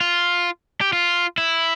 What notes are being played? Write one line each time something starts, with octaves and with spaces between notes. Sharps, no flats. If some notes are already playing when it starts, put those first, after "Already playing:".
F4
G4
F4
E4